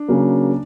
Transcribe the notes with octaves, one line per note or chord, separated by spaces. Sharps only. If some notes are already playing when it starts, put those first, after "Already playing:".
Already playing: D4
C#3 F#3 A#3